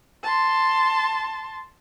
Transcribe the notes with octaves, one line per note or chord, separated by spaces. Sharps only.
A5 C6